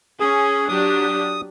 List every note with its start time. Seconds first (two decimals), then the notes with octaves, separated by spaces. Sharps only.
0.20 C#4 G#4
0.69 F#3 D4 G4 D#6